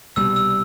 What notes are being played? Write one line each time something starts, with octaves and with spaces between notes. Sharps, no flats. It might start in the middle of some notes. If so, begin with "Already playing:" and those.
C2 B2 G3 E6
E6